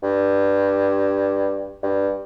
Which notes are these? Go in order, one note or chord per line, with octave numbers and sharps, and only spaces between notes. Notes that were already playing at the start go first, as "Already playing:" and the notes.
G2
G2